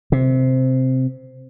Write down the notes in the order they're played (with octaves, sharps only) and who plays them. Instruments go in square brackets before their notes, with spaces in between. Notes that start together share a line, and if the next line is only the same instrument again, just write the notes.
[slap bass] C3